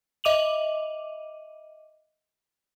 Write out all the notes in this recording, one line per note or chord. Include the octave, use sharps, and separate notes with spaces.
D#5 E5 D6 D#7 F7 F#7